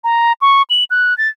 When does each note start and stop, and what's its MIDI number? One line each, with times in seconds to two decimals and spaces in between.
0.04 0.32 82
0.41 0.62 85
0.70 0.84 102
0.90 1.16 90
1.18 1.28 93